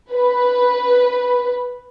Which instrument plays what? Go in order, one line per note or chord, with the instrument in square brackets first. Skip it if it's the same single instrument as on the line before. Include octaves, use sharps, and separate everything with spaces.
[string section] B4